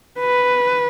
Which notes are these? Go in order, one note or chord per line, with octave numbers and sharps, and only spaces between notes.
B4